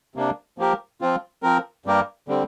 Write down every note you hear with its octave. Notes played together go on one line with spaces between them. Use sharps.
C3 A#3 D4
F3 A#3 G4 A#4
F3 C4 F4
F3 C4 A#4
G2 G3 A#3 G4 A#4
D3 G3 C4